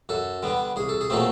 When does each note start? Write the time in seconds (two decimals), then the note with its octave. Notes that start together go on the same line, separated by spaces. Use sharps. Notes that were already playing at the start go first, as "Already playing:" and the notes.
0.09 F#2 A4
0.43 D3 G3 B3
0.76 C2 G#4
0.89 A4
1.01 G#4
1.10 A#2 F#3 A3 C4 A4